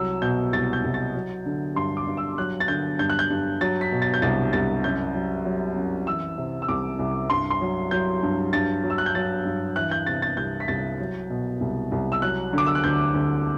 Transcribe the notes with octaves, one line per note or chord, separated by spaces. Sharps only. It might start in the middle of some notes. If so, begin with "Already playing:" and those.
Already playing: C2 F#3 E6
B2 G6
C2 A6
G6
C2
A6
F#3
D3
G2 C6
D6
G2
E6
F#3 F#6
A6
D3 G6
G2 G6
F#6
G6
G2
F#3 A6
B6
B2
A6
G6
C2 A6
C2 A6
F#2 G6
F#3
F#3
F#2
E3 E6
C3
E6
C2 D6
C2
G2 C6
C6
F#3
F#3 G6
G2
G2 A6
F#3
E6
F#6
G6
F#3 A6
G2
E3 F#6
G6
C3 A6
A6
C2 G6
B6
C2 A6
F#3
B2
C2
C2
E6
F#3 F#6
D3 D6
E6
F#6
D2 G6
D2